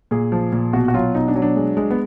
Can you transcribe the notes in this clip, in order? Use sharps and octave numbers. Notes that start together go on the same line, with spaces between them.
A#2 G#4
F3
A#2
B2 F#4
F#4
F#3 F4
B2 D#4
D4
F#3
D4
G#3
G#3
B3